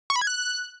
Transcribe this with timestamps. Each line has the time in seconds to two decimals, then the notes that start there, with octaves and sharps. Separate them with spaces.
0.10 C#6
0.16 B5
0.21 G#6
0.27 F#6